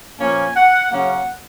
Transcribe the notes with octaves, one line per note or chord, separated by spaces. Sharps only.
A#2 F3 A#3 C#4 G#5
F#5
C#3 F#3 A#3 C#4 F#5